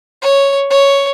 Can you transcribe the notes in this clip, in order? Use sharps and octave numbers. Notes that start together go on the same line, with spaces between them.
C#5
C#5